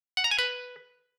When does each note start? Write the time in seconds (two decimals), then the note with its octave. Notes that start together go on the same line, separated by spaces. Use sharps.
0.17 F#5
0.24 A#5
0.31 G#5
0.39 B4